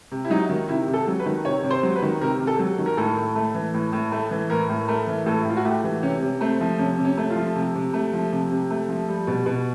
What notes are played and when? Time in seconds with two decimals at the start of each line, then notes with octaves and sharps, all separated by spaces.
0.11 C3
0.24 E4
0.30 F#3 D#4
0.49 D#3
0.68 C3 E4
0.88 C3
0.93 A4
1.07 F#3
1.19 B4
1.26 D#3
1.45 C3 C#5
1.64 C3
1.70 C5
1.83 F#3
1.96 B4
2.02 D#3
2.21 C3 A#4
2.40 C3
2.47 A4
2.59 F#3
2.78 D#3
2.86 A#4
2.97 A2 A4
3.17 A2
3.35 A3
3.55 E3
3.74 A2
3.93 A2
4.12 A3
4.31 E3
4.50 A2 A#4
4.70 A2
4.88 A3 A#4
5.07 E3
5.26 A2 A4
5.40 E4
5.45 A2 F4
5.57 F#4
5.65 A3 G4
5.84 E3
6.03 C3 C#4
6.22 C3
6.41 A3 C4
6.60 F3
6.79 C3 C#4
6.98 C3
7.05 C#4
7.17 A3
7.30 F4
7.36 F3
7.56 C3
7.75 C3
7.94 A3
8.13 F3
8.32 C3
8.51 C3
8.71 A3
8.89 F3
9.09 G3
9.27 B2
9.46 B2